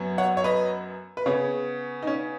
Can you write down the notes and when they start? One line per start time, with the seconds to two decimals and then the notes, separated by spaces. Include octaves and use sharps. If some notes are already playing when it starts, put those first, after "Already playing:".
Already playing: F#2 F#3 B3
0.18 C#5 F#5
0.37 C#5
0.44 B4 D#5
1.17 B4
1.26 C#3 B3 G#4 C#5
2.02 D#4
2.07 C#4